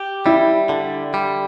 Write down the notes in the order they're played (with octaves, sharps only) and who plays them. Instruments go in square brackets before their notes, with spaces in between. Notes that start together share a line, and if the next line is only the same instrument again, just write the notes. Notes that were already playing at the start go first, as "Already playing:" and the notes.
Already playing: [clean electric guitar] G4
[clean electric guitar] G3 [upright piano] E4
[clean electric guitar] D3
G3